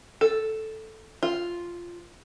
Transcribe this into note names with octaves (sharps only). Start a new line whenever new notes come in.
A4
F4